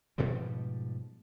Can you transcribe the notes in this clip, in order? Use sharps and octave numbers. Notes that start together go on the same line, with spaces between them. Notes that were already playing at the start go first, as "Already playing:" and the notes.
G#2 B2 F3 G3